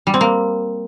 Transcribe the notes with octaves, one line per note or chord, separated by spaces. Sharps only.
G3
C4
A#3